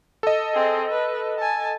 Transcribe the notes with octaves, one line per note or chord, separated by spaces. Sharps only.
A4 D#5
C4 G#4
B4
G#5 A5